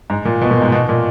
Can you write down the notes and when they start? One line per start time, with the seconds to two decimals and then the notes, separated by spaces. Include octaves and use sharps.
0.10 G#2
0.25 A#2
0.41 B2
0.51 A#2
0.62 G#2
0.72 B2
0.89 A#2